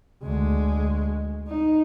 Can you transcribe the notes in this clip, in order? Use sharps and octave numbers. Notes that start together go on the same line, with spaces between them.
D2 G#3
D#4